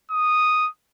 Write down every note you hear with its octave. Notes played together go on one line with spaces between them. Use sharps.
D#6